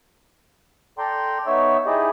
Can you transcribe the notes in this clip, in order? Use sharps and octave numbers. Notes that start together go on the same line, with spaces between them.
A4 D5 G5 A#5 C6
B3 D#4 C#5 E5 E6
D#4 E4 G4 G#4 D5 D#5